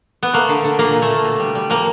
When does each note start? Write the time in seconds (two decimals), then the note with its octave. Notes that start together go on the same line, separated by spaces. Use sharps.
0.23 B3
0.33 A3 A#3
0.49 D3
0.64 D3
0.79 A#2 A#3
0.95 A#2
1.02 A3
1.10 A#2
1.24 B2
1.40 G3
1.55 G3
1.70 F3 A#3